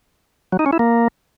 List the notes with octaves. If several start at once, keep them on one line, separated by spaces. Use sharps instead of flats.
F#3
D#4
C#4
E4
A#3